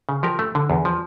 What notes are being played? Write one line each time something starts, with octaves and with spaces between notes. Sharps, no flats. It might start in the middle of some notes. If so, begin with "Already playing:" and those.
C#3
F3 G4 A#4
A3
D3
E2
F3